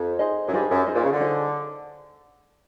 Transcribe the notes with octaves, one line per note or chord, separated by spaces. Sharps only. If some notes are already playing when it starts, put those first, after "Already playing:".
Already playing: F2
D#4 G#4 C5 D#5
F#2
G2 D#4 G#4 C5 D#5
F#2
D#4 G#4 C5 D#5
A#2
C#3
D3
D#4 G#4 C5 D#5